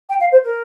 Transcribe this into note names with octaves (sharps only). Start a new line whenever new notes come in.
G5
F5
C5
A#4